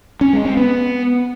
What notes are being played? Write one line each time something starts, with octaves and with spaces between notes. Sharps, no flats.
C#4
G#3
C4
B3